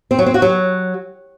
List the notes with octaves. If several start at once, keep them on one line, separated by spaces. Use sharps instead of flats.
C4
F#3
C4
F#4
F#3